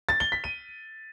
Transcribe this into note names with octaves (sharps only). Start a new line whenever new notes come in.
A6
G7
B6
D#7